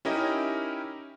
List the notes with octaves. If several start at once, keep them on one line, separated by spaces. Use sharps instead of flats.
C#4 D#4 E4 G4 A#4 D#5